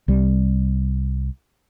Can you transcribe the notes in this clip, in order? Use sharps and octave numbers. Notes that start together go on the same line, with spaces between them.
C2 G3